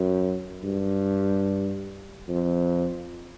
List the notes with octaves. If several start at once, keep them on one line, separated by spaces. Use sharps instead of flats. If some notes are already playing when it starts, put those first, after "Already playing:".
Already playing: F#2
G2
F2